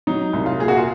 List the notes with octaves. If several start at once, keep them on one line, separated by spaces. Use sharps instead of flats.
F#3 D#4
C2
F4
A#2 G#4
F#4
F4